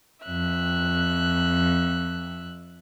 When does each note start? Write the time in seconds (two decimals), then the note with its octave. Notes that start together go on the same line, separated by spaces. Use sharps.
0.24 F2 E5 F#6